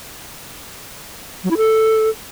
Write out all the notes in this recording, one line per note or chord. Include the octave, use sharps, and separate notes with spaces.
F#3
E4
A4